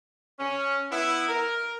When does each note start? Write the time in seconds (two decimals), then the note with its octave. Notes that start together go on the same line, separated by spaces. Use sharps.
0.40 C#4
0.91 B3 E4
1.29 A#4